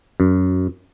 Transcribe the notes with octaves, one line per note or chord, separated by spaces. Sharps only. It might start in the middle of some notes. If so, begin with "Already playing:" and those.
F#2